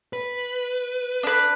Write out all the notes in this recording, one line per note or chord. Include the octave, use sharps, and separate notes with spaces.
B4
D4 B4